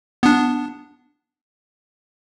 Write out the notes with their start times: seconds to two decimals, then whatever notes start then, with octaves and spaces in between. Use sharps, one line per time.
0.23 B3 D4